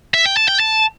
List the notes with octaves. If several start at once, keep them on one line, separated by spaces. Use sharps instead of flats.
E5
G5
A5
G5
A5